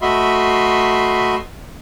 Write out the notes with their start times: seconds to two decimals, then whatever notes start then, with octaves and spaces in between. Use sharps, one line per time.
0.02 A3 F#4 D#5 E5 B5 C6